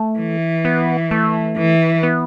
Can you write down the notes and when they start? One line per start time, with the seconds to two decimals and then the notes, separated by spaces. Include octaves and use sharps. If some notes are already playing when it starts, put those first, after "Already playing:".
Already playing: A3
0.19 E3
0.65 B3
1.11 A3
1.57 E3
2.03 B3